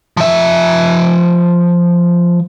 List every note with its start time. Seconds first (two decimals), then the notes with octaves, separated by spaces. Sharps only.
0.17 F3 E5